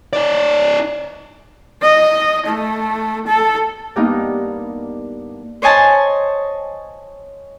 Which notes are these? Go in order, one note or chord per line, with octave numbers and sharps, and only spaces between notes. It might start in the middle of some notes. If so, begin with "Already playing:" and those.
D#4 D5
D#5
A3
A4
G2 G3 A#3 B3 D#4
C5 C#5 D#5 G#5 A5